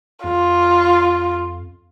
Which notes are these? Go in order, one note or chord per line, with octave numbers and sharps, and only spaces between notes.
F2 F4